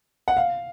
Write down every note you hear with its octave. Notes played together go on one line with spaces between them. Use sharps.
F#5
F5